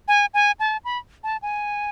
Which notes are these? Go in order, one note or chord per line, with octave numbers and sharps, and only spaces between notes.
G#5
G#5
A5
B5
A5
G#5